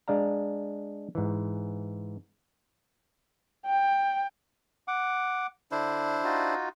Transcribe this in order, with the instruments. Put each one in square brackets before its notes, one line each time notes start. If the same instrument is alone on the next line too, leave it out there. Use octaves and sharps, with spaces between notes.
[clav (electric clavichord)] G#3 D4 D5 F5 A#5
G#2 E3
[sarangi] G5
[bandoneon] F#5 D6
[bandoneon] D3 [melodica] D4 E4 C5
[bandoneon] D#4 F4 F#4